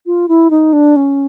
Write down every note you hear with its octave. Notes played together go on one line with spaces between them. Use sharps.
F4
E4
D#4
D4
C#4